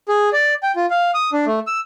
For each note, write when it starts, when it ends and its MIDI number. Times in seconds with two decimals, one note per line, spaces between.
0.08 0.29 68
0.33 0.54 74
0.63 0.72 79
0.76 0.86 65
0.90 1.11 77
1.14 1.30 87
1.33 1.45 62
1.46 1.59 57
1.67 1.80 88